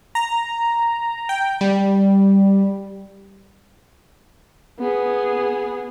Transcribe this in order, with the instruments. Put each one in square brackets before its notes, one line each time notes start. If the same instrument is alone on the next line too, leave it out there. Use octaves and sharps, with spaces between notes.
[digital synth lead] A#5
G5
G3
[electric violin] B3 G#4